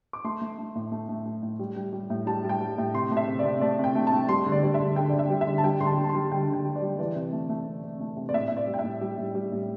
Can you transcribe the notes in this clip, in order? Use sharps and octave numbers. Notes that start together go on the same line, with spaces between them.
D6
A3 C6
A3
A3
A2
A3
A3
A3
A2
G3
G3
G3
A2
G3 A5
G3
G5
G3
A2
C3 C6
A3
E5
C3
D5
C3
A3 D5
C3 G5
A3
A5
A3
G3 C6
D3
D5
G3 D5
E5
D3
D3 G5
D3 D5
E5
G3
E5
D3
A5
G3 G5
D3 C6
A5
G3
A5
C6
G3
D3 G5
D3
G5
G3
D5
G3
E3 D5
C3
A3
A3
C3
C3
A3
C3
D5
A2 E5
A2 E5
D5
G3
G5
A2 E5
G3
A2
G3
A2